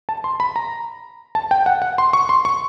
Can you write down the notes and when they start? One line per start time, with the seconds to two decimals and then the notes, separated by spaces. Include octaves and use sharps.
0.09 A5
0.24 C6
0.40 B5
0.56 A#5
1.35 A5
1.51 G5
1.66 F#5
1.82 F#5
1.98 C6
2.13 C#6
2.29 C6
2.45 C#6